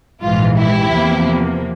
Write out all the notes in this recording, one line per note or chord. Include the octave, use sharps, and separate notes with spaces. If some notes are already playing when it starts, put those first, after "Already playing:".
A#1 G#2 E3 F4
E4 G4
E2 C3 F3 A#3